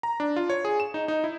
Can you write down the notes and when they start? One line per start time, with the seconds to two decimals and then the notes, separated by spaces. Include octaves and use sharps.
0.03 A#5
0.20 D4
0.36 F4
0.50 C#5
0.65 G#4
0.80 E7
0.94 D#4
1.08 D#4
1.24 E4